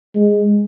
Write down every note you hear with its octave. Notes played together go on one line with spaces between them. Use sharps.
G#3